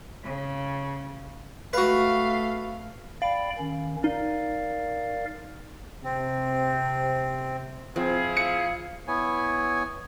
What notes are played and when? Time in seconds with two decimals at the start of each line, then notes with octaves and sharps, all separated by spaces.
0.24 C#3
1.73 A3 F#4 B4 F5
3.22 D5 F5 G5 B5
3.58 D#3 C#4
4.04 D#4 A#4 D5 F5
6.04 C3 C4
7.96 F3 C4 E4 F4 G#4
8.37 F5 C#7
9.08 B3 E4 C#5 G#5